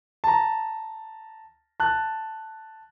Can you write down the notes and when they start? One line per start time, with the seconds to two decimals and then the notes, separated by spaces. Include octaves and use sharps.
0.24 A5 A#5
1.80 A5 F#6